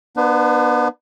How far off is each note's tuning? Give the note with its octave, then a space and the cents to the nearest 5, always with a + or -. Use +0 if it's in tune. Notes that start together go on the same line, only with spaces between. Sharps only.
B3 -25 D4 +35 B4 +40